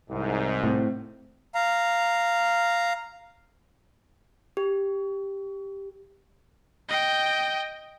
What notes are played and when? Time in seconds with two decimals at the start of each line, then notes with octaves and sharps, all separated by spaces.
0.10 C2 G#2
0.63 A2 C4
1.55 F5 A#5
4.57 G4
6.89 D#5 G5